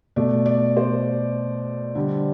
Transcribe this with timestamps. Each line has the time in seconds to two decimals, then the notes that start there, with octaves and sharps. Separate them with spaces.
0.16 B2 A3 D5
0.46 D5
0.77 C5
1.95 D3 G3